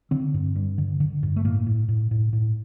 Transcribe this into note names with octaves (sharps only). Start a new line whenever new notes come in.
D3 C4
G2
G2
D3
D3
G2
A3
A2 A#3
A2
A2
A2
A2